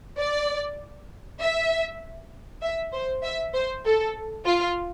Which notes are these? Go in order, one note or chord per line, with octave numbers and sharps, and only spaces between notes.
D5
E5
E5
C5
E5
C5
A4
F4